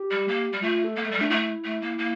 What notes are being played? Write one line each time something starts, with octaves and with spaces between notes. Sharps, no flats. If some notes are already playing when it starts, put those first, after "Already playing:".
Already playing: G4
G3
A#3
G3
A3 F4
A4
A#3
A3
G3 A4
A3 D4
A3 E4
A3
A#3
A#3